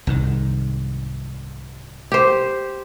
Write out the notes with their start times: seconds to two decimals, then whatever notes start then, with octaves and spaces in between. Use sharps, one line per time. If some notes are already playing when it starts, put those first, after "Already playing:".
0.07 C2 G#2 D#3
2.12 G4 C5